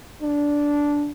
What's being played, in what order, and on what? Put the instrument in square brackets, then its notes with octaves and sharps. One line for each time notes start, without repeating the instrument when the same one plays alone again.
[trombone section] D4